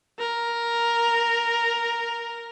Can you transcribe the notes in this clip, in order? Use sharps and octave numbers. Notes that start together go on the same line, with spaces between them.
A#4